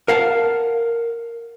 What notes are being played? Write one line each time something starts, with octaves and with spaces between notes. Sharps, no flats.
A#4 F5 F#5 A5